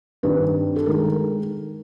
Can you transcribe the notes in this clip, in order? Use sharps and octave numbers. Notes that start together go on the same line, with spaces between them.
G2 D#3 G3 C4 B4
A4
D#3 G#3 A#4